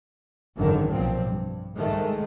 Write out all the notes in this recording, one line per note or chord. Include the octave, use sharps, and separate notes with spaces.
G#1 F#2 D3 D#3
B1 A#2 F3 C4
G2
C2 G#2 D#3 G#3 A3